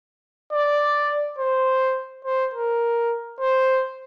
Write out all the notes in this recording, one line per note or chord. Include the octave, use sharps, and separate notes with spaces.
D5
C5
C5
A#4
C5